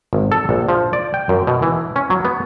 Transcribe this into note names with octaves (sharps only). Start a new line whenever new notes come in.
G#1
A4
A#1
F3
D5
G5
F#2
B2
E3
C#4
F#3
B3